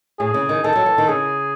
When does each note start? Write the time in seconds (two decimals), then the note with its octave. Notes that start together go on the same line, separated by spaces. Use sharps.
0.19 A2 G#4
0.34 C#3
0.49 D#3
0.64 D#3 A4
0.76 F#3
0.86 E3
0.98 D#3
1.08 C#3 G#4